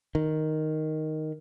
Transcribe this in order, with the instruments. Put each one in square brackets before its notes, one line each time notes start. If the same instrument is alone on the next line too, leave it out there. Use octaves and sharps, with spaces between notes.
[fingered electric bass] D#3